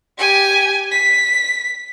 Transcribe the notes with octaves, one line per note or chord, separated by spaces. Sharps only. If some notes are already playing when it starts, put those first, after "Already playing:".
G4 G#5
B6